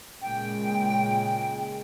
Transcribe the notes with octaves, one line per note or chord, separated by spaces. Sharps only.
A#2 C#3 G#3 G5